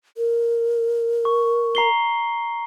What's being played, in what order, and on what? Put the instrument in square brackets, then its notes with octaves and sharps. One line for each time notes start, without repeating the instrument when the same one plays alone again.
[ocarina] A#4
[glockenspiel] C#6
A#5 C7 G7